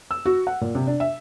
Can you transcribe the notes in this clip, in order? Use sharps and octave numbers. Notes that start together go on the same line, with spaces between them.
E6
F#4
F#5
A#2
C3
D4
E5